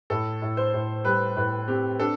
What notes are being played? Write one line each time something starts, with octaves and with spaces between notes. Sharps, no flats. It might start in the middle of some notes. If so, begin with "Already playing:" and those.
A2 A4
A2
C5
A2
G3 B4
A2 B4
C4 G4
D4 A4